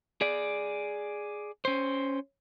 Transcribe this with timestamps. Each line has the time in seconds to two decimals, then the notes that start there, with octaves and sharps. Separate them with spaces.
0.21 G#4 D5
1.65 C#4 C5